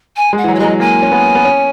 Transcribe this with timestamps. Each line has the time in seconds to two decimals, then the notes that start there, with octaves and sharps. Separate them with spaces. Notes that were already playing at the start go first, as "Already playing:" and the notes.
0.16 G#5
0.33 G#3 F#5
0.44 E3
0.48 F#3
0.55 C#5
0.59 G#3 D#5
0.64 F#3
0.80 A#3 G#5
1.02 C#4
1.12 B3
1.35 B3
1.45 C#4